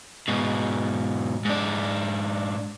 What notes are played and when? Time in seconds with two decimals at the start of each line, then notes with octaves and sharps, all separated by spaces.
0.28 G#2 B2
1.45 G#2 D4